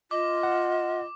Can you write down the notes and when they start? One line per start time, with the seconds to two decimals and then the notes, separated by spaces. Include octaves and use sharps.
0.11 F4 D#5 D6
0.43 F#5